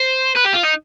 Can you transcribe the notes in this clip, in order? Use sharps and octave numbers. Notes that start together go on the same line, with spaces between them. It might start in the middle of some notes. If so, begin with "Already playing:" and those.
Already playing: C5
B4
G4
F4
D#4